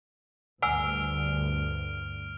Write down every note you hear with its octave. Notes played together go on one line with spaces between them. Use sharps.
D2 G2 F#5 G#5 E6 F6 D7 F7